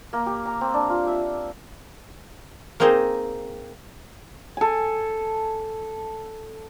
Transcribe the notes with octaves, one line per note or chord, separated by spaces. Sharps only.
A#3
G4
A#5
C4
D4
F4
E5
A#3 C4 D#4 G#4 C5 D#5
A4 G#5